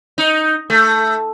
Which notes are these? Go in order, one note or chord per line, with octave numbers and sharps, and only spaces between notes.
D#4
A3